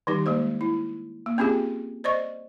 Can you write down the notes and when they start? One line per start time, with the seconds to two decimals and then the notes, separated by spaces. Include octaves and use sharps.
0.07 D#3 G3 D#4 G4
0.26 G#3 A#3 C5
0.61 E4
1.26 A#3
1.38 C4 C#4 F4 G4 G#4
2.04 C5 D5 D#5 C#6